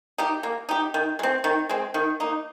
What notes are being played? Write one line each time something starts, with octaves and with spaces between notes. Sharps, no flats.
D#4 G4
A#3
D#4 G4
D#3
G#3
C4
D#3
G#3 C4
D#3
A#3 D#4